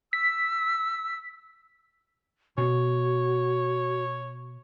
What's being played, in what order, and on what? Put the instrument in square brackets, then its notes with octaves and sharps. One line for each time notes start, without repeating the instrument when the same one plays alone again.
[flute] E6 [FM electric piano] B6
[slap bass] B2 [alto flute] F#4 [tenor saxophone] C#5